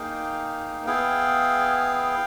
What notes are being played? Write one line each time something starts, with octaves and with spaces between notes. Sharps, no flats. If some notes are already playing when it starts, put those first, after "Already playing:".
Already playing: A#3 D#4 G#4 F5 G5
B3 E4 G#4 F5 G5